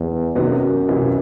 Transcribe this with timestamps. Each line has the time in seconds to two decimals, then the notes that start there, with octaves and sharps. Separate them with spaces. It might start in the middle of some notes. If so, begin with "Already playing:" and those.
Already playing: E2
0.35 F#2 C3 D#3 F#3 B3
0.88 C#2 C3 E3